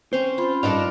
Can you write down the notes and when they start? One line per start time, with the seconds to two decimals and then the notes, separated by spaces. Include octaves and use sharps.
0.13 C4 C#4 C5
0.38 C#4 F4 B5 C6
0.63 G2 D4 D#4 A4 A#4 D5 F5